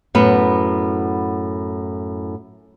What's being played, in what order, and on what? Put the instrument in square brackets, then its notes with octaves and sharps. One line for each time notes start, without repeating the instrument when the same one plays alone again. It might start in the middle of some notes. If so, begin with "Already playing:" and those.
[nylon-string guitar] F#2 A2 B3